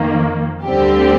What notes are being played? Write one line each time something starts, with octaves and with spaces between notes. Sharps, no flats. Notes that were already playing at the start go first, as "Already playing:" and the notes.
Already playing: F2 D#3 A#3
D2 D3 G3 C4 G4